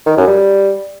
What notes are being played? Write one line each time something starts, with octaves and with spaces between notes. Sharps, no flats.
D#3
F#2
G3